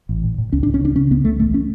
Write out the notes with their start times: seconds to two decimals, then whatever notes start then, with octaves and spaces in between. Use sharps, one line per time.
0.09 A1
0.23 A2
0.38 A2
0.52 C#2 C#4
0.63 D4
0.67 C#2
0.74 C#4
0.81 C#3 D4
0.96 C#3 C#4
1.11 C#2 B3
1.25 C#2 A3
1.39 A1 A3
1.54 C#4